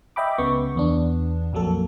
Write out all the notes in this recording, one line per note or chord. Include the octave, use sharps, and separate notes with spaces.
D#5 E5 G5 B5 D6
C#2 C#3 B3 C#6
E2 B3 D4
A#1 F2 F#3 A#3 A4